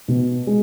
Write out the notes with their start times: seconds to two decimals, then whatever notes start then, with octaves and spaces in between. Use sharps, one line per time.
0.08 B2
0.47 G#3